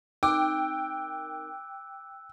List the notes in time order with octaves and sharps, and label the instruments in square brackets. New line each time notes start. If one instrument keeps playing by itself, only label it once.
[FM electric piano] C4 D#4 A#4 [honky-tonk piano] G5 [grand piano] D6 [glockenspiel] E6 F#6